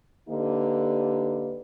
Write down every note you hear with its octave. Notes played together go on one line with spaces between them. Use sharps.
D3 A#3 D#4 G4 B4